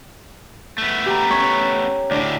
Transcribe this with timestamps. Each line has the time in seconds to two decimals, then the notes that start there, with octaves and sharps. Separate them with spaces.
0.78 A3 B3
1.06 G4 A#5 B5
1.30 C#4 C#5 C#6
2.11 D2 A2 D4